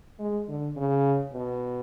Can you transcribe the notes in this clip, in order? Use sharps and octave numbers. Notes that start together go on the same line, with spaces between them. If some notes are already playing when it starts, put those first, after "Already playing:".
G#3
D3
C#3
B2